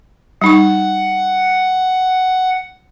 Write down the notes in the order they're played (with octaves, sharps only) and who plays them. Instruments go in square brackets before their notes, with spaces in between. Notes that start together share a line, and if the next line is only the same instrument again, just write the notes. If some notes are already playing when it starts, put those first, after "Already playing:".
[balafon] G3 D#4 C#6 [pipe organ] F#5